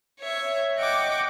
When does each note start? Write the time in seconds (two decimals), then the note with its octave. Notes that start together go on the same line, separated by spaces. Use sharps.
0.21 C#5 E5
0.77 D#5 F#5 G5 C#6 D6